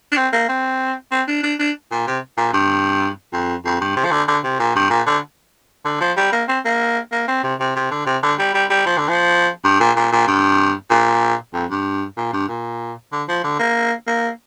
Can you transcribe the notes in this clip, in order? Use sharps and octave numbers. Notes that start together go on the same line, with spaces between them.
D4
C4
A#3
C4
C4
D4
D4
D4
A#2
C3
A#2
G2
F2
F2
G2
C3
F3
D3
D3
C3
A#2
G2
A#2
D3
D3
F3
G3
A#3
C4
A#3
A#3
C4
C3
C3
C3
D3
C3
D3
G3
G3
G3
F3
D3
F3
G2
A#2
A#2
A#2
G2
A#2
F2
G2
A#2
G2
A#2
D3
F3
D3
A#3
A#3